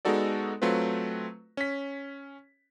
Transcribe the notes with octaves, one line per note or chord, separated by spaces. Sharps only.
G#3 B3 D#4 F#4 A4 D5
F#3 A3 C4 F4 B4
C#4 B6